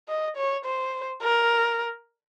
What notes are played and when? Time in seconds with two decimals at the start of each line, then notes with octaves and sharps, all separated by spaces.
0.08 D#5
0.37 C#5
0.65 C5
1.22 A#4